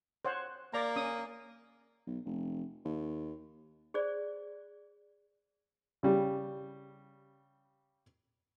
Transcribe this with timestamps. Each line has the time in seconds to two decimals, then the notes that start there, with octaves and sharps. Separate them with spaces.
0.25 C5 C#5 F#5
0.74 A#3 D5 A#5
0.96 C#4 D#6
2.06 B1
2.25 F1
2.85 D#2
3.94 G#4 C5 D5
6.03 C#3 G3